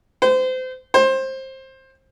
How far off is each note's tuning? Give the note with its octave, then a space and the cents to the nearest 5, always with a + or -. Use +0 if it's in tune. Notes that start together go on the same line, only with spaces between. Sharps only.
C5 -30
C5 +20